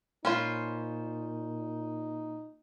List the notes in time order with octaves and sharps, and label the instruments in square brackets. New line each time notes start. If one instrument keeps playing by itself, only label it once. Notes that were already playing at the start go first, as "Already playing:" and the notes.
[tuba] A#2 [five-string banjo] C#4 F4 [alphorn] D#4 [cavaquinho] C5 F5 B5